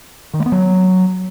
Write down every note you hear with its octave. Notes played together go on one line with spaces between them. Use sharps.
D#3
A3
B3
F#3